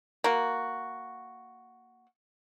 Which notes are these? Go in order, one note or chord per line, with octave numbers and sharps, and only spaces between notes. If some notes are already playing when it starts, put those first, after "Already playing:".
A#3 F#4